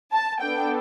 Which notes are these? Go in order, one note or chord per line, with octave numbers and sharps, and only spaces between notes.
A5
B3 D4 A4 G5